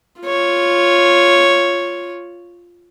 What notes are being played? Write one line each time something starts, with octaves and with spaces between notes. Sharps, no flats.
F4 C#5